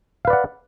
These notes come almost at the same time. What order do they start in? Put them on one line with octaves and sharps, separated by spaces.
F5 B4 D5 F#5